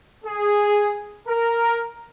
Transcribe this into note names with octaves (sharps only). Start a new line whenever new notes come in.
G#4
A#4